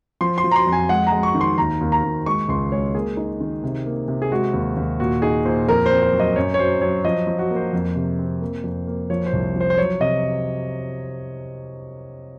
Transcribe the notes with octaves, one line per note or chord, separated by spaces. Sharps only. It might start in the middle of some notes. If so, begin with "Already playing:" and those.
F3 C6
C6
F3
A#5
C6
F2
G#5
G#3 F#5
A#5
G#3
C#6
D#3
C6
D#2 A#5
D#2
A#5
D#2
G#3 C#6
C#2 C6
G#3 C#5
A#3 G#4
D#4
D#3
C3
A#3
C3
G#4
G#3 F#4
D#2
D#2
A#2 F#4
D#4 G#4
A#2 C5
F2 A#4
C4 C5
C5
F#3
D#5
F#2 C#5
C#5
F#3 C5
F#3 C#5
F3 D#5
F3
F#4
A#3
C5
F2
C3
C4
A#3
F2
A#3
F3 C#5
C5
C2
F3 C5
C5
F#3 C#5
C3 D#5